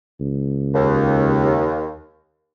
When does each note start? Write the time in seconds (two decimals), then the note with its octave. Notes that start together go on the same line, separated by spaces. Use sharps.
0.20 C#2
0.74 D#2